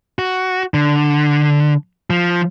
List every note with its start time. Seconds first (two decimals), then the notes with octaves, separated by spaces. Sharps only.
0.19 F#4
0.74 D3
2.10 F3